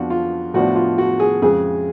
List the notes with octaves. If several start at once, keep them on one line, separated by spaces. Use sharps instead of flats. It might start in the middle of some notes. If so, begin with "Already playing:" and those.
Already playing: F2 F3 B3 D4 F#4
F4
A2 F3 B3 D4 F#4
F4
F#4
G#4
F2 C#3 G#3 G#4